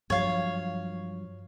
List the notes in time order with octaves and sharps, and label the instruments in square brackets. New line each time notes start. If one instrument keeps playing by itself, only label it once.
[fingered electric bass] G2 F3 F#3 [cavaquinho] C#5 F5